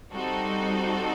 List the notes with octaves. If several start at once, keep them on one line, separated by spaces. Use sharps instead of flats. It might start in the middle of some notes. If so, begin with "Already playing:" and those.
G3 C4 D#4 F#4 A4